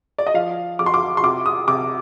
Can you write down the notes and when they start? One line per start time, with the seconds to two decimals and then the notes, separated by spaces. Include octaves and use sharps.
0.18 D5
0.27 D#5
0.34 F3 F5
0.79 F2 D6
0.86 C6
0.94 D6
1.17 C6
1.24 C3 D6
1.46 D#6
1.68 C3 D6